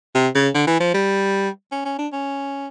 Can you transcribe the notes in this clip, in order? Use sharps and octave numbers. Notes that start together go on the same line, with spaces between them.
C3
C#3
D3
E3
F3
G3
C#4
C#4
D4
C#4